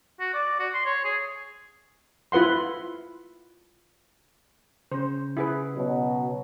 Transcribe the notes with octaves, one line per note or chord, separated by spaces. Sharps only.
F#4
D5
F#4
C6
C#5
G#4
E4 F4 B4 F#5 C6
C#3 C#4 C5
E4 G#4 B4
B2 F#3